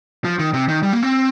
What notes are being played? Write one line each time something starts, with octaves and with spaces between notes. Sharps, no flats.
F3
D#3
C3
D#3
G3
A#3
C4